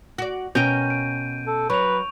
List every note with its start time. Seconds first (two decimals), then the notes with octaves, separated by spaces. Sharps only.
0.18 F#4 D5
0.55 B2 C#4 A#4 G5 G6 D#7
0.90 D7
1.47 A4
1.70 F#3 B4 C#6 F7